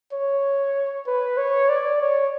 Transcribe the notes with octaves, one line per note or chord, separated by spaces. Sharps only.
C#5
B4
C#5
D5
C#5